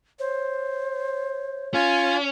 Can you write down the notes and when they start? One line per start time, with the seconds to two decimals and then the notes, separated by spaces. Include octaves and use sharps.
0.19 C5 C#5
1.74 C#4 F4 G#5